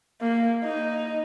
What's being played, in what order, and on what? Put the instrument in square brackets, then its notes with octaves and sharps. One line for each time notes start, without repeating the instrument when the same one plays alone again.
[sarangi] A#3
D#4